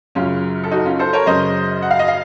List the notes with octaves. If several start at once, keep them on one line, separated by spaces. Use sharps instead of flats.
F#2 C#3 C#4 F4
A4
D#4 F#4
C#4 F4
A4 C5
A#4 C#5
F#2 C#3 C5 D#5
F#5
F5
D#5
F5